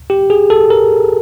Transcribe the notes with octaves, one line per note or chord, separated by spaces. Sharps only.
G4
G#4
A4
A#4